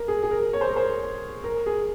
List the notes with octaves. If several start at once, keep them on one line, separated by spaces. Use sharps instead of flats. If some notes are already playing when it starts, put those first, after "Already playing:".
Already playing: A#4
G#4
G#4
A#4
C#5
C5
A#4
C5
A#4
G#4